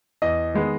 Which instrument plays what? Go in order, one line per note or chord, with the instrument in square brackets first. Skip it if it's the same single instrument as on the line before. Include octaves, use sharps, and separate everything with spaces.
[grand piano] E2 D#5
D#3 G#3 B3